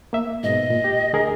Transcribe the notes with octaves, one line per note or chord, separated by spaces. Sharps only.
A#3 E5
G#2 B2 D#5
A#2
G4
D2 G#4 A#4